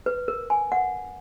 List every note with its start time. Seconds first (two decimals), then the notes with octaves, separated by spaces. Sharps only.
0.06 B4
0.28 A#4
0.50 G#5
0.72 F#5